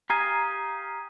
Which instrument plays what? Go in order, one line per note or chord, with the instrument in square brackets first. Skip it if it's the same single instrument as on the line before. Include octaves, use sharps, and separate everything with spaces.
[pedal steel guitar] G4 F5 G#5 [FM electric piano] A#5 [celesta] D#6 G#6 D#7